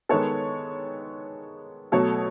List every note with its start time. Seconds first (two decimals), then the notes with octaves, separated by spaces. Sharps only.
0.09 D#3 G#3 B3 A4 C#5
1.92 B2 F#3 A3 A4 C#5